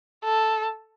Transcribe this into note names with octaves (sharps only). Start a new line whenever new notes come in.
A4